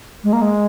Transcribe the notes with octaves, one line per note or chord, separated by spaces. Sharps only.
G#3
A#3
G#3